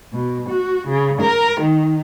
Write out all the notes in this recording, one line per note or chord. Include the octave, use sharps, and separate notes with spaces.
B2
F#4
C#3
A#4
D#3